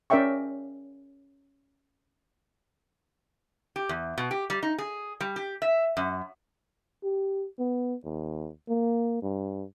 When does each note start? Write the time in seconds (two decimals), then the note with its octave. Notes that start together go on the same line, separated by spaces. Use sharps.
0.10 C#4 A#4 D5 E5 G5 C#6
3.76 G4
3.89 E2
4.18 B2
4.31 G4
4.50 G3
4.63 D#4
4.78 G#4
5.20 G3
5.36 G4
5.62 E5
5.97 F#2
7.03 G4
7.59 B3
8.05 D#2
8.69 A#3
9.22 G2